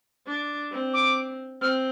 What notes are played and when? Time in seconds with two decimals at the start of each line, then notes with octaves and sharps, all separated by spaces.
0.27 D4
0.72 C4
0.93 D6
1.61 C4 F6